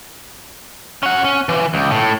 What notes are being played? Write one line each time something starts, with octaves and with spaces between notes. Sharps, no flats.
C#4 F#5
C#4
E3
C#2
A2